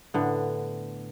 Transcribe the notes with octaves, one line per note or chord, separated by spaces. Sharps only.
A2 D3 B3